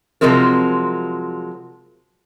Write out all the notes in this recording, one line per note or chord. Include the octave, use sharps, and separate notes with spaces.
C3 F3 F#3 G#3 C4 A#4